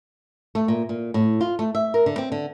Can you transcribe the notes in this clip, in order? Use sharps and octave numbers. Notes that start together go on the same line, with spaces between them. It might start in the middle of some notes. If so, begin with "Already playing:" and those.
A3
A#2
A#2
A2
F4
A3
E5
A#4
D3
C4
D3